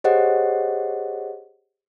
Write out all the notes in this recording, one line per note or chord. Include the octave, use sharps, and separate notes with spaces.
G4 G#4 C5 C#5 D#5 F#5